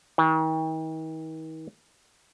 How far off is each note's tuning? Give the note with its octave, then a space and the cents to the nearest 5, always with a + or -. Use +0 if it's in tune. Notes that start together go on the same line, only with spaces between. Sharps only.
D#3 +40